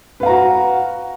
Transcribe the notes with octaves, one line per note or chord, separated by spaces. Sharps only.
F#4 B4 F5 A#5